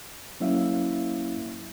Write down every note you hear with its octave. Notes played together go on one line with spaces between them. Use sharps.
F#3 A#3 C#4 E4 E5 F5